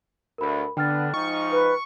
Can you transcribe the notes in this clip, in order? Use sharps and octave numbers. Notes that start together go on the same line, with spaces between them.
D2 A#4 B5
D3 B3 D4 G5 F6 A6
G#2 F3 D#4 C#6
B4